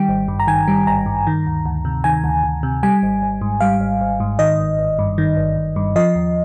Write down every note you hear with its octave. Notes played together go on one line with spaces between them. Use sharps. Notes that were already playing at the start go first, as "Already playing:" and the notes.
Already playing: D#3 G3 G5
G#1
G2
A#5
D#3 G#5
G3
G#1 A#5
G2
D#3
D2
D2
C3
D#3 G#5
D2
D2
C3
G3 G#5
G#1
G#1
G#2
G3 F5
G#1
G#1
G#2
D#3 D#5
G1
G1
G2
D#3
G1
G1
G2
F3 D#5
D#2